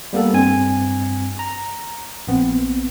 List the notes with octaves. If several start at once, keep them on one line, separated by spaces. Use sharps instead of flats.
G3 A#3 B3 A4
G2 C4 G#5
A#5
A#1 B3 C4